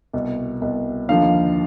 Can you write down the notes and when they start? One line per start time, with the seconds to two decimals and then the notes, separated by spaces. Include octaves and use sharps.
0.13 C2 B2
0.61 C2 B2
1.09 D#2 D3 F3 F5